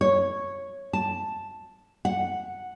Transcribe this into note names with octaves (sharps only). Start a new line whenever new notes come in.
C#5
A5
F#5